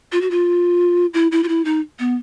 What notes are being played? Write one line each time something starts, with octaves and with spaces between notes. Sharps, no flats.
F4
F#4
F4
E4
E4
F4
E4
D#4
B3